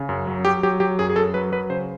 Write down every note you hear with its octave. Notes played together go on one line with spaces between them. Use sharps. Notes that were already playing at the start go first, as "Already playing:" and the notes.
Already playing: C#3
F#2
F#3
F#3 G4
F#3 G4
F#3 G4
F#2 G#4
G#4
F#2 A4
F#3 B4
F#3 B4
C#3 C5